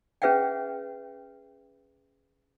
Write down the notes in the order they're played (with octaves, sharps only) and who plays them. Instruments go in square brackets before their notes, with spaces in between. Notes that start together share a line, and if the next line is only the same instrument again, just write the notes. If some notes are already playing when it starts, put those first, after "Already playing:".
[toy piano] C#4 G#4 B4 E5 F#5 G5